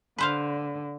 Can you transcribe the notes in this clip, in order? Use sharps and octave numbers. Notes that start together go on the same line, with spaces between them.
D3 B4 C5 F5